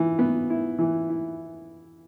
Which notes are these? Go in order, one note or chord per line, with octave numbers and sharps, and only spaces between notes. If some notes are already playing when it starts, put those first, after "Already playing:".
Already playing: E3
B3
E4
E3
E4